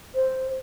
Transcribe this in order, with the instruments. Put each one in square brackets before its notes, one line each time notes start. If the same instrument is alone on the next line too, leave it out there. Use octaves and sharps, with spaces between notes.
[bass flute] C5